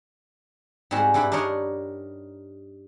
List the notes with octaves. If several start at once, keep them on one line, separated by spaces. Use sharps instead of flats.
G#2 G3 G#3 C4 F#4
G2 G3 E4 B4 B5
D4 D#4 A#4 C#5 D#5